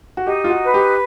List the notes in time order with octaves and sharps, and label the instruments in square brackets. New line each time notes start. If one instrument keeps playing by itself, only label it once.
[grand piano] F#4
[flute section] D#4 [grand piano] G4
[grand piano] F4
F#4
[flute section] B4
[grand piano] G4